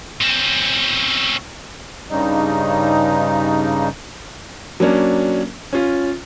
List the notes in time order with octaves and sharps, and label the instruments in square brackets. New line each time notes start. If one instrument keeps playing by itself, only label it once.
[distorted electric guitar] C4 C#4
[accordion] G2 C#3 G3 D#4
[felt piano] F#3 A#3 C#4 D4
C#4 F4